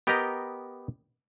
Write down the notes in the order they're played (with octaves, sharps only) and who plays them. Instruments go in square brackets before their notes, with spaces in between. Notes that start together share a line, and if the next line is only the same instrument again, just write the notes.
[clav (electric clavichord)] B3 G4 A#4 D#5 G5 A#5